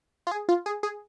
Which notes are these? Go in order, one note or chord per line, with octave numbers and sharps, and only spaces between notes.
F4
G#4
F4
G#4
G#4